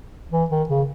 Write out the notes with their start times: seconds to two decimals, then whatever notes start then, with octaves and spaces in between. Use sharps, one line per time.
0.32 E3
0.50 D#3
0.69 C#3